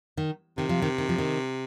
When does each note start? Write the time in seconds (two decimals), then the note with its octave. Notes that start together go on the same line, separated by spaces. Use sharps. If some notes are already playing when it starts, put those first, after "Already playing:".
0.17 D#3
0.58 C3 D#3
0.69 F3
0.82 D#3
0.98 D#3
1.09 F3
1.18 D#3